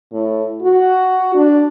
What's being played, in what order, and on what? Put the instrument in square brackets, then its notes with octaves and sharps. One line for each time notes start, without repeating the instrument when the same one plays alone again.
[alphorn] A2
F#4
D4